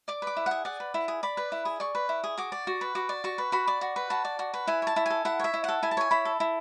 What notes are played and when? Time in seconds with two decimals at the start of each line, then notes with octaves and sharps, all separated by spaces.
0.08 D5 D6
0.22 B4 D6
0.37 E4
0.46 G#4 F#5
0.65 D5 F#5
0.80 B4
0.94 E4
1.08 G#4
1.23 D5 B5
1.37 B4
1.52 E4
1.65 G#4
1.80 D5 C#6
1.95 B4
2.09 E4
2.24 G#4
2.38 F#4 D6
2.52 D5
2.67 F#4
2.81 B4
2.95 F#4 D6
3.09 D5
3.24 F#4 C#6
3.38 B4
3.52 F#4 B5
3.68 D5
3.81 F#4
3.96 B4
4.10 F#4 A5
4.25 D5
4.39 F#4
4.54 B4
4.67 E4 G#5
4.82 C#5 A5
4.96 E4
5.06 A4 G#5
5.25 E4 F#5
5.40 C#5 E5
5.54 E4
5.64 A4 F#5
5.83 E4 G#5
5.91 A5
5.97 C#5 G#5
6.11 E4 B5
6.25 A4
6.40 E4